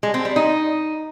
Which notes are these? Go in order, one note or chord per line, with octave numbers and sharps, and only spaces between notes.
G#3
C4
G3
D#4